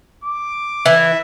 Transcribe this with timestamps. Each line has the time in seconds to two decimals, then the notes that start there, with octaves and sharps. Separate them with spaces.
0.24 D6
0.86 E3 E5